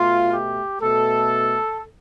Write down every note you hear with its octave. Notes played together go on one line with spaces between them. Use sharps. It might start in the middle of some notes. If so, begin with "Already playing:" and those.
Already playing: B2 A3 F4
G4
B2 A3 A4